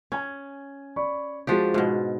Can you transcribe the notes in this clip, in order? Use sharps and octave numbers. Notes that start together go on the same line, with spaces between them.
C#4 G#5 G#6
D5 B5 C#6
F3 G#3 D4 F#4 G4
G#2 B2